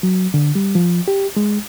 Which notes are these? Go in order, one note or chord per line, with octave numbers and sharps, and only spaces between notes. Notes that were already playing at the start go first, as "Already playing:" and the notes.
F#3
D3
G3
F3
G4
G#3